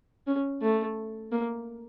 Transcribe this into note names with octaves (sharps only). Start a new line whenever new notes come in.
C#4
A3
A#3